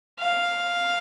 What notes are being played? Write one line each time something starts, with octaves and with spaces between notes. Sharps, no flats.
F5